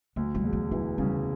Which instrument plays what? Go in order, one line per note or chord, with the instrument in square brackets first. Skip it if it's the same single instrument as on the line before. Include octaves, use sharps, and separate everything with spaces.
[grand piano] D2 [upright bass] F#3
[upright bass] G3
[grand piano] E1
[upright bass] F#3
[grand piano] E3 [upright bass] F#3
[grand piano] C#3 [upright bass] G3